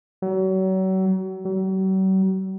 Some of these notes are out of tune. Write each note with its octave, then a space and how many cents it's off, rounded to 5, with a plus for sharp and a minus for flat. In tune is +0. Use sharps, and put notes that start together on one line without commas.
F#3 +35
F#3 +45